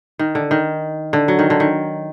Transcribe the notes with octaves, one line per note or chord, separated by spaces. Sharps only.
D#3
D3
D#3
D3
F#3
D#3
D3
D#3